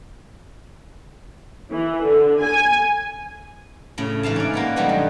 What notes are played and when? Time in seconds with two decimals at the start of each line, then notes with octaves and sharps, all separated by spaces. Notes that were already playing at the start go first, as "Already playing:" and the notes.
1.72 E3
2.04 D3
2.43 G#5
3.98 A2 C#3
4.23 G#2 E3 F5 A5
4.36 C#4 D5
4.53 A#3 B3 B4
4.76 B2 D#3 F#3 G3 A3 B3
4.89 G2